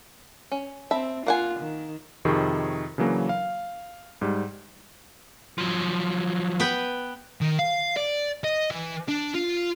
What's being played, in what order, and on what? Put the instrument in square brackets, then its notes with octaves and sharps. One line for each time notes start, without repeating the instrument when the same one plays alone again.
[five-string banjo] C#4
[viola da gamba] C4 [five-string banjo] E5 A5 B5
[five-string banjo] A#3 F#5 G#5 [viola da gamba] F4
[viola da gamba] D#3
[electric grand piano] F2 C3 D#3 G#4 C#6
C#3 E3 F#3 A#3 D4
F5
G#2 G3
[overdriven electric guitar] F3 F#3
[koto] B3 B4 G5
[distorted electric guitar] D#3
F5
D5
D#5
E3
D4
F4